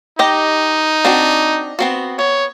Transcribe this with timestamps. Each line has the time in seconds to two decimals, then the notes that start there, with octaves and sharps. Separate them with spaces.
0.19 D#4 G4 D#5 G5
1.05 C4 D4 F#4
1.79 B3 C4 F#4
2.19 B3 C#5